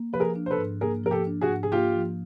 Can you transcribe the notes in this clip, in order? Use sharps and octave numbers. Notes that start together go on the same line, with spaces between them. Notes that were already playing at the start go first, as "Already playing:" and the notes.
Already playing: A#3
F3 B4
G#4 A#4
D4
C5
A4 B4
G#2
A#3 G#4 A#4
F3 A#4
G4 A4
D4
F#4 G#4
G#2
G#4
A#3 F4 G4
F3